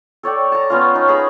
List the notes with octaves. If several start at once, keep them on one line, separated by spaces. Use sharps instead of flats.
A4 C#5 D5 G5
A5 A#5
B3 C#4 F4
C#4 D#4
G#4 A#5 B5